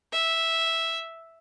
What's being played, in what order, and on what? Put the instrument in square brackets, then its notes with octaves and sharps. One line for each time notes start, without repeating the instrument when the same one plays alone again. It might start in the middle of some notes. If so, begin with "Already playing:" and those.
[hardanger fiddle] E5